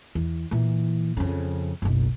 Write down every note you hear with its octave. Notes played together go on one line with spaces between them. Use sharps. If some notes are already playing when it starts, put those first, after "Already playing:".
E2
A#2 E3
F2 C#3
F#1 B1